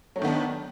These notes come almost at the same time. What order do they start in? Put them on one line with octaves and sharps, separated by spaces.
F#3 A3 D#3 B3 D4